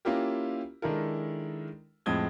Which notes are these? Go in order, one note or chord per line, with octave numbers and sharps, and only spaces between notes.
A#3 C#4 E4 F4 G4 A#4
D#3 G#3 D4 E4 A4 A#4
F2 A2 G#3 D#6 G#6 G7